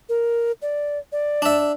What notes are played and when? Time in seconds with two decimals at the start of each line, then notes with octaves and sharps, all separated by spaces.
0.09 A#4
0.62 D5
1.12 D5
1.42 D4 E5